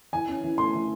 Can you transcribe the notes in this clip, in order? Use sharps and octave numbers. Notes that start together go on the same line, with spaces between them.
E3 G#5
C#4
E3
A3 C6
E3